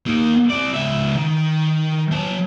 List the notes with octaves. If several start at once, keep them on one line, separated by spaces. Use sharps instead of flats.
A#3 D#4
C4 D5
C#2 E5
D#3
F#3 A5